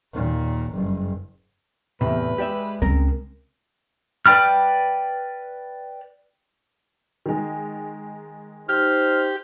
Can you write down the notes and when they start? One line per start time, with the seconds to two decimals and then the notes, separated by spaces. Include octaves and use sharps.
0.14 D#2 A#2
0.73 F#1 G2
2.01 E2 A2 C3 B4
2.38 G#3 G4 D5 E5
2.82 C#2 C4 A#4
4.26 B4 D5 G5 B5 F6
7.26 D#3 G#3
8.69 D#4 G4 C5 F6